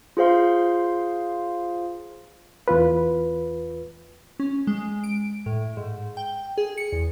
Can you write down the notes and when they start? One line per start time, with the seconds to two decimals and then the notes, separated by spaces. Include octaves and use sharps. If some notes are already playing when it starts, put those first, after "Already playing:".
0.17 F4 G#4 C5 F5 C6
2.68 E2 F4 B4
4.40 C#4
4.67 G#3
5.04 D7
5.46 A2
5.77 G#2
6.17 G5
6.58 G#4
6.77 C#7
6.92 E2